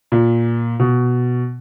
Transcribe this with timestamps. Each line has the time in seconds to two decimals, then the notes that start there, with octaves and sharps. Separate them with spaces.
0.12 A#2
0.80 B2